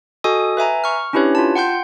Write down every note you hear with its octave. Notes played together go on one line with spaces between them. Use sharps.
F#4 A4 D#5 G#5 D#6
B4 E5 G#5 A#5
C#6 F6
C#4 D4 E4 G4 B4 C#5
F4 A5
F#5 G5 C6 G6